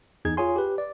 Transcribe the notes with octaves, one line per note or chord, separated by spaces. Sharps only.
E2 D#4 G#4 G#6
F4 G#4 C#5 G#5 C6
G4 B4
D5